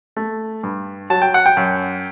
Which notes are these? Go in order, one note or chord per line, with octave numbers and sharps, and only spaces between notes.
A3
G2
F#3 A5
G5
F#5
G5
F#2